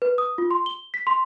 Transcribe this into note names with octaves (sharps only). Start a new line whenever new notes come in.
B4
D#6
F4
C6
G7
B6
C6